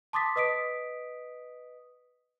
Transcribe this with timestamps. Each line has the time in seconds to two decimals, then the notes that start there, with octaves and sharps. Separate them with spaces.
0.13 A5 C6 D6 D#6 A6 B6
0.36 B4 D#5 D#6 B6 D7